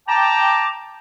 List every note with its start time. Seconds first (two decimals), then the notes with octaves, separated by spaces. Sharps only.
0.08 G5 A5 A#5 D6